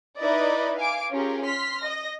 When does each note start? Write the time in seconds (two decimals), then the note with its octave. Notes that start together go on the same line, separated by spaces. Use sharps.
0.19 D#4 E4 B4 D5 D#5
0.79 F5 G#5 D6 D7
1.12 C#4 F4 G4 G#4 A#4
1.46 C6 F6 B6
1.83 D#5 A#6